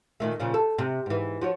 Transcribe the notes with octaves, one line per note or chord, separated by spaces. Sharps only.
A#2 D#3 A3
A#2 C#3 F3
A4
C3
G#2 E3
F3 F#4 C#5